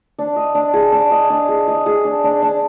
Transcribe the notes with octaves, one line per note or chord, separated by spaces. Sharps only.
D4
D#5
D4
G#4
D4
D#5
D4
G#4
D#5
G#4
D4
D4
D4